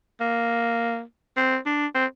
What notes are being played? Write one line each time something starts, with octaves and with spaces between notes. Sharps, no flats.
A#3
C4
D4
C4